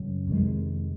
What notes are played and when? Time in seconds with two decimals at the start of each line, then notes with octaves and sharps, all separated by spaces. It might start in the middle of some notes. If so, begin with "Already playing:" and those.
Already playing: F#2 C#3 F#3
0.27 F2 C3 D#3 G#3